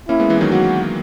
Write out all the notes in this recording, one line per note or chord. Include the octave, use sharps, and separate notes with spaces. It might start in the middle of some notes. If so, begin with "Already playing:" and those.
A#3 C#4 E4
G#3 B3
E3 G#3
D#3 F#3
F#3 A#3 F#4